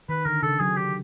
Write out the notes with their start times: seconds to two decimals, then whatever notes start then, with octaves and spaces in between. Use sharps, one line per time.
0.09 D#3 B4
0.26 D3 A#4
0.43 C#3 A4
0.60 F#3 G#4
0.77 G4